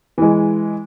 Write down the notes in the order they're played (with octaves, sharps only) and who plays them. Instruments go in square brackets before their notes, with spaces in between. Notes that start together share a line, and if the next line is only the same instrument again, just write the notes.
[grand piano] E3 G#3